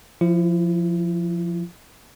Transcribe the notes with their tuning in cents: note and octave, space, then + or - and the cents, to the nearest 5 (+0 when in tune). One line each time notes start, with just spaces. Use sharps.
F3 +0 E4 +35